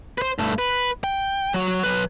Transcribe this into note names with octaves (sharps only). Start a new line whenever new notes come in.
B4 C5
G2 A3
B4
G5
F#3 F#4
F#3 B4